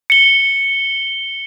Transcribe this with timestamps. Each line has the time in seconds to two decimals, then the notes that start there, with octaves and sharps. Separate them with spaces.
0.10 C#7 G7